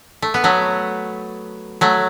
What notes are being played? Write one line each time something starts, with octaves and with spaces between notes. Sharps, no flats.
A3
B3
F#3 A3
F#3 A3